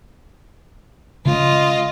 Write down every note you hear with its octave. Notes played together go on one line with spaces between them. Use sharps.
C#3 G#3 F4 D#5